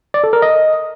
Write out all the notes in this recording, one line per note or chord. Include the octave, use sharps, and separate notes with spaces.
D5
A4
A#4
D#5